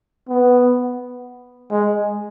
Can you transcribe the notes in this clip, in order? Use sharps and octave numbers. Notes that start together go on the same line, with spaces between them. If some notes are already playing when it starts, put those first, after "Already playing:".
B3
G#3